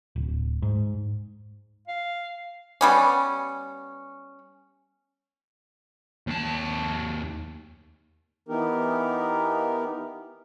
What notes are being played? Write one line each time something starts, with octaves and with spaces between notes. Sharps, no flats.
D1
G#2
F5
G3 B3 C#4
D#2 A5
E3 B3 D#4 G4 A#4